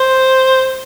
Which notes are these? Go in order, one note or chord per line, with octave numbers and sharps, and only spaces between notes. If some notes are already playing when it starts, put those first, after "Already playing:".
Already playing: C5